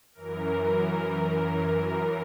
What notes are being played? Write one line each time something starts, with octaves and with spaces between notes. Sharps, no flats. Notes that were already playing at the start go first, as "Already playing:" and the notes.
F#2 E3 A#4